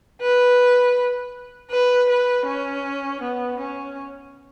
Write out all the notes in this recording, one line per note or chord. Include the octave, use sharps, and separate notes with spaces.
B4
B4
B4
C#4
B3
C#4